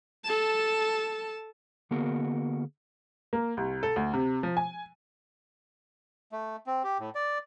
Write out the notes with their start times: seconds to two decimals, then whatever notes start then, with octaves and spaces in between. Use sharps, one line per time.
0.25 A4 A5
1.91 D3 A#3 B3 F#4 G#4 A#4
3.33 A#3
3.57 C2
3.83 A4
3.96 D2
4.13 C3
4.43 F3
4.57 G#5
6.32 A3
6.67 C4
6.84 G4
6.99 A2
7.15 D5